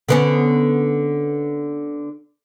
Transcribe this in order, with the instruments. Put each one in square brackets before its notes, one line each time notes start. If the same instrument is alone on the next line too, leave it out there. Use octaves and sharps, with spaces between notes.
[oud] D3 B3 C#4